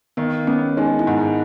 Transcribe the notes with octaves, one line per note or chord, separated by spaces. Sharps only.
D#3 B3
B3 C#4
G#3 D#4
E4
G#2 D#4